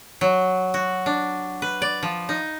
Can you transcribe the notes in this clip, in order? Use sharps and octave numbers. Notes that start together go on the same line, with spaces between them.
F#3
F#4
D4
B4
D5
F3
D#4